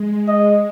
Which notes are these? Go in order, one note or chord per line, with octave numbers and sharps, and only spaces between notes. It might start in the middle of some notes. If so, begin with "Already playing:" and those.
Already playing: G#3
D#5